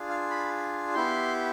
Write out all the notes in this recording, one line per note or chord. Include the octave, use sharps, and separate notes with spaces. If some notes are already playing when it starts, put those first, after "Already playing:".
Already playing: D4 F4 G#4
F5
B5
B3 E4 G4 C6